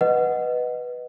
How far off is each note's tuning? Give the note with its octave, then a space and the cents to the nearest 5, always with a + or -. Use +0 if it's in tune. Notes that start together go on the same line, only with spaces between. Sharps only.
B4 +0 D#5 +0 F#5 +0